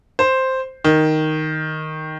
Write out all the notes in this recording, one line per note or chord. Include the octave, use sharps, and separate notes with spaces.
C5
D#3